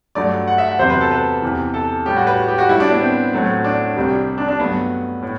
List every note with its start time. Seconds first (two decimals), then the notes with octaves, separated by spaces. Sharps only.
0.15 G2 F#3 A3 D5
0.47 F#5
0.58 E5
0.68 F#5
0.79 E2 C3 F#3 C5
0.90 B4
1.01 A4
1.11 B4
1.42 E2 C3 E3
1.74 A4
2.06 A2 G3 G4
2.16 F#4
2.27 B4
2.48 G4
2.58 F#4
2.69 A2 G3 E4
2.80 D4
2.90 B3
3.01 C4
3.33 A2 F#3 A3
3.64 D4
3.96 C2 C3 G3
4.38 D4
4.48 D4
4.59 G2 F#3 A3 B3
5.22 A2